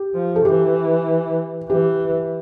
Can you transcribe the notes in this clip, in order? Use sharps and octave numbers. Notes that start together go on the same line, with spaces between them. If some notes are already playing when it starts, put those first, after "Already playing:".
Already playing: G4
F3
A4
E3 G4
E3 G4